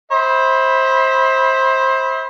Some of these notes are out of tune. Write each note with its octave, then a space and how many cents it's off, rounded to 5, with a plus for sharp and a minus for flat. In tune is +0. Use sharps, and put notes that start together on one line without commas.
C5 +20 E5 -40 B5 +0